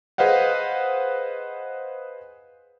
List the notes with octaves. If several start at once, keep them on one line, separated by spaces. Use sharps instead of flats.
G#4 B4 C5 D#5 F5 F#5